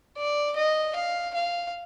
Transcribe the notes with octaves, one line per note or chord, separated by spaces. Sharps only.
D5
D#5
F5
F5